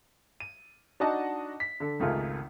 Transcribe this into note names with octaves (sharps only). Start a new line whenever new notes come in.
D#7
D4 D#4 F#4 D#5 F#5 A5
B6
D3 A4
G#1 C#2 A3 F4 G#4 A#4